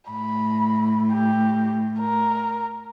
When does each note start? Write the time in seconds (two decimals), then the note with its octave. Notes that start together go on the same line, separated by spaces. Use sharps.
0.11 A2 B5
1.13 G4
1.99 A#4